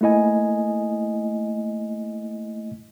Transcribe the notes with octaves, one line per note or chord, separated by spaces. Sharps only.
A3 A#3 E4 D#5 G#5